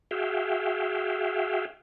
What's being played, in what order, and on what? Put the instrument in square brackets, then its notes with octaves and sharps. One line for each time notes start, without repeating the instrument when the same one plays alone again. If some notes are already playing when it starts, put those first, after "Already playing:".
[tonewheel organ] F#4 G#4 E5 F5 G5